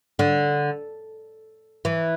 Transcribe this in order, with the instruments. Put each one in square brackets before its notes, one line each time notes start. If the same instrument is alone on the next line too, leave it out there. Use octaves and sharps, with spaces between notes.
[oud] D3
E3